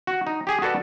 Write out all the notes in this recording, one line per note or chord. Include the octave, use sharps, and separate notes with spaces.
F#4
D#4
G4 G#4
F#4 A4 B4 D5